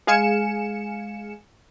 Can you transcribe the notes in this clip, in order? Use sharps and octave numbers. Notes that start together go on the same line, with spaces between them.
G#3 G#4 F5 G#5 C#7 E7